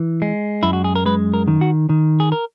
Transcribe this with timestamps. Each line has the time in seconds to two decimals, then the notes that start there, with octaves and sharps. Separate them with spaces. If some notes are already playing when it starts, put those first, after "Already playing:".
Already playing: E3
0.22 G#3
0.63 F#2 E4
0.73 F#4
0.84 G#4
0.95 A#4
1.06 G#3 B4
1.34 A#4
1.48 D#3
1.61 F#4
1.89 D#3
2.20 G#4
2.32 A#4